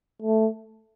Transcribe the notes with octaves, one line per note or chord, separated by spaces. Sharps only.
A3